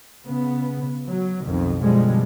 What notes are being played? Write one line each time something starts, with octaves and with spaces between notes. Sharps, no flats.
C#3 B3
F#3
B1 F2 D#3
F#2 B2 D3 F3 G3 G#3